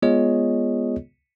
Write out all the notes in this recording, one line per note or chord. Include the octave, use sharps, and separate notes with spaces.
G#3 B3 F4 G#4 C#5 D#5